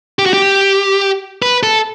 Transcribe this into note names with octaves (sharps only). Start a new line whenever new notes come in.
G4
F#4
G4
B4
A4